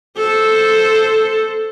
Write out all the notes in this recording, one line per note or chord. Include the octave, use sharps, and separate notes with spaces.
A4 C5